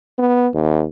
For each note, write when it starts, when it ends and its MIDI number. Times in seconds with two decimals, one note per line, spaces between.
0.19 0.48 59
0.54 0.86 39